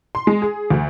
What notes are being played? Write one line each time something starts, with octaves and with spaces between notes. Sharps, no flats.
C6
G#3
G#4
D2